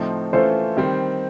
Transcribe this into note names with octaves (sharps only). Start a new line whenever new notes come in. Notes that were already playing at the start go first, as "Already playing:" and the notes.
Already playing: A2 F3 A3 C4 D#4
E3 A3 C#4 F4 A4 C5
D#3 G3 C4